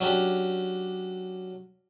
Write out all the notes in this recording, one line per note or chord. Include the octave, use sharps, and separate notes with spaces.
F#3 C#4 D4 G4